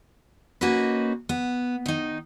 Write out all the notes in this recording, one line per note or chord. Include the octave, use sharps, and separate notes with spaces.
A#3 C#4 D#4 F#4 B4
B3
D#3 D#4